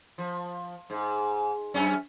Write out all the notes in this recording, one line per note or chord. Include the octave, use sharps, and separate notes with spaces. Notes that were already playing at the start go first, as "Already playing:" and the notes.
F3
G#2
F#2 C#4